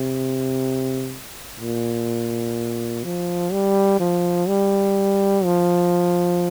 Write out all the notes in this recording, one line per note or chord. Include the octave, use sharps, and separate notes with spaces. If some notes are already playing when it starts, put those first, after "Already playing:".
Already playing: C3
A#2
F3
G3
F3
G3
F3